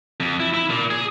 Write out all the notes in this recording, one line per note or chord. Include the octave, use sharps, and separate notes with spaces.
F2
E4
E4
A#2
G#4